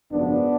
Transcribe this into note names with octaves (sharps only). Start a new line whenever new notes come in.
G#1 F#2 C#3 F3 B3 D4